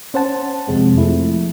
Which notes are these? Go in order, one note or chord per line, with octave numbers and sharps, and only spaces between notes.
C#4 C5 F#5 A5
F2 C3 G#3 C4
F3 A3 E4